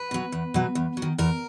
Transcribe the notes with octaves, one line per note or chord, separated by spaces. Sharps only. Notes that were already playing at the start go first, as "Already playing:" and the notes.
Already playing: B4
B2 F#3
E2
B2 F#3
E2
F#3
D#3
E2 A#4